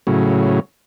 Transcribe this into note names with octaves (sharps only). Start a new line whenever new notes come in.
A2 C#3 F#3